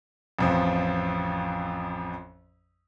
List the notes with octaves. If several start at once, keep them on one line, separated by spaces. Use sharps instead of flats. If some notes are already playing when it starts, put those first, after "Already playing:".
A1 F2 F3